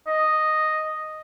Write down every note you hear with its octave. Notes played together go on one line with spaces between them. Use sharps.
D#5